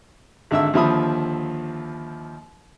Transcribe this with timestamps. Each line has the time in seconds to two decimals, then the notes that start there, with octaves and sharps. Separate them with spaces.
0.51 G#1 D3 E5 E6
0.73 D#2 D3 F3 E5 B5 D#6